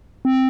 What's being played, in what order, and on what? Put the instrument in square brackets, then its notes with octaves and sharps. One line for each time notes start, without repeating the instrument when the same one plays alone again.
[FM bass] C4